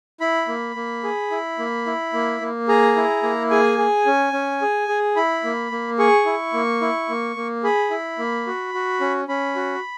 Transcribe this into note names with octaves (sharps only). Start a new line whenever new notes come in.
E4 B5
A#3
A#3
G#4
E4
A#3
E4
A#3
A#3
G#4 A#5
E4
A#3
G#4 G#5
G#4
C#4
C#4
G#4
G#4
E4 B5
A#3
A#3
G#4 C#6
E4
A#3
E4
A#3
A#3
G#4 B5
E4
A#3
F#4
F#4
C#4
C#4 B5
F#4